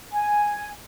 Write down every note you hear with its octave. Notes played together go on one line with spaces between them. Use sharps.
G#5